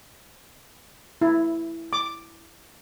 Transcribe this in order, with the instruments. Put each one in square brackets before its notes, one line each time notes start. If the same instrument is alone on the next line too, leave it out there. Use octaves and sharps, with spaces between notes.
[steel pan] E4
D6